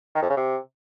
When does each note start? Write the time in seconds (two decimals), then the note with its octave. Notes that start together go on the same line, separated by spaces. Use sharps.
0.15 D#3
0.22 F2
0.29 C#3
0.37 C3